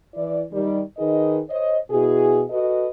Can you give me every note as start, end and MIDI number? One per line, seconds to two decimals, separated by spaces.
0.15 0.42 52
0.15 0.42 64
0.15 0.42 74
0.52 0.80 51
0.52 0.80 55
0.98 1.39 51
0.98 1.39 63
0.98 1.39 68
0.98 1.39 71
0.98 1.39 75
1.49 1.77 72
1.49 1.77 73
1.49 1.77 75
1.91 2.43 47
1.91 2.43 64
1.91 2.43 66
1.91 2.43 68
2.50 2.88 66
2.50 2.88 69
2.50 2.88 71
2.50 2.88 75